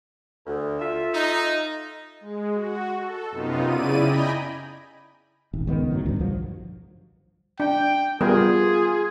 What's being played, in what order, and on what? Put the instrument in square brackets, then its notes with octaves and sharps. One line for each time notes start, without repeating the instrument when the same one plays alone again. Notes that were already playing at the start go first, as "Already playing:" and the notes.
[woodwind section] D2
F4 A4 E5
[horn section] D#4
[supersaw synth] G#3
F#4
A4
F#2 C3 B3 D#4 F4
C#3 E4 D5 D#7
D#5 G5 G#5 A#5 B5
[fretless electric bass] D#1 G#1
C#2 D#3 B3
G#1 F#2 A2 F#3
D2 G2
B1 G2 F3 F#3
[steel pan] D4 [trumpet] G5
[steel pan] G3 B3 A#4 [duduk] F4 [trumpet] G#4